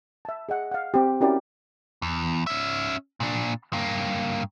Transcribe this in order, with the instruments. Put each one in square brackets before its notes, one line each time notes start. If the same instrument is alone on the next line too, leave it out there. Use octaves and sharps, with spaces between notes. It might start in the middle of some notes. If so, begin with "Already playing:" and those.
[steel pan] E5 A5
G#4 D#5 F#5
F5 F#5
C4 G4
C#4 E4 F#4 G4 A#4 D5
[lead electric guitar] E2
C#4 E5
A#2 D4
G2 A#3